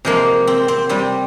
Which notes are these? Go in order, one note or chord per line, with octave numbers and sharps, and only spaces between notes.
C3 F3 G#3 A#3
C4
C4
C3 G3 C4